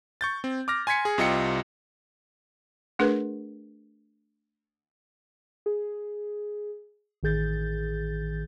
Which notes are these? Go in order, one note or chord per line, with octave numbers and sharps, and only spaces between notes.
C#6 G6 A6
C4
D6 F6 A#6
G#5 C6 G#6 B6 C#7
G#4
C2 C3 F4 D#5 G5 C#7
A3 D4 G#4 A#4 B4
G#4
A1 D#3 G#4 G6 A6